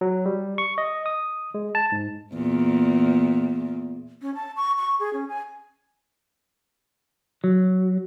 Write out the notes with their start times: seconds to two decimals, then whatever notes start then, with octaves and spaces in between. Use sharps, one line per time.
0.01 F#3
0.26 G3
0.58 C#6
0.78 D#5
1.06 D#6
1.54 G#3
1.75 A5
1.92 G#2
2.33 E2 A#2
4.22 C#4
4.35 A5
4.56 C#6
4.78 C#6
5.00 G#4
5.13 C#4
5.29 G#5
7.44 F#3